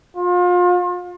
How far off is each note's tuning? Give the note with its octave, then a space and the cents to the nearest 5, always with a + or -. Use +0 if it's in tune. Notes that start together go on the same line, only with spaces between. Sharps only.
F4 +35